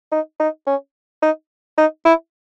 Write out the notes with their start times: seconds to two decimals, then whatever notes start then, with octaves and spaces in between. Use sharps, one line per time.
0.12 D#4
0.40 D#4
0.67 C#4
1.22 D#4
1.78 D#4
2.05 E4